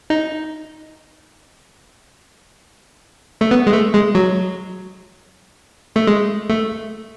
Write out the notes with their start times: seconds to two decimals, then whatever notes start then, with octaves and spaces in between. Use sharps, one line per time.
0.10 D#4
3.41 A3
3.51 B3
3.67 G#3
3.73 A3
3.94 G#3
4.15 F#3
5.96 A3
6.07 G#3
6.50 A3